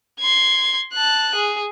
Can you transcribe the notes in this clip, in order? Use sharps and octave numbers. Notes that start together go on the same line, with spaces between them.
C6 G#6
A5 F#6
G#4